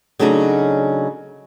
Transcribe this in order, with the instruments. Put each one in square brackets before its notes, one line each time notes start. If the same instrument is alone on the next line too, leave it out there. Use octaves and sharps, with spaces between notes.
[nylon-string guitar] C#3 F#3 A3 D4 D#4 F#4